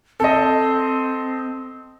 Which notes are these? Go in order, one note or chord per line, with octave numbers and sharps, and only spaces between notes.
C4 A4 D#5